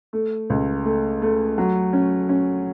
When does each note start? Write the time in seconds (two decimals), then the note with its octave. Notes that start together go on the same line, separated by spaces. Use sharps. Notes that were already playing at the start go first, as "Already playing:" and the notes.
0.13 A3
0.50 C#2
0.85 A3
1.22 A3
1.58 F#3
1.93 C#4
2.29 C#4